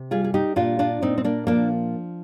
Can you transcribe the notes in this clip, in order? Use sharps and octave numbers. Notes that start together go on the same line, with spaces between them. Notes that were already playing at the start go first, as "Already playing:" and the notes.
Already playing: C3
G3 F4 G#4
G#4
D#4 G4
A#2 D4 F4
D4 F4
A#2 C4 D#4
C4
A#3 D4
F3 A#3 D4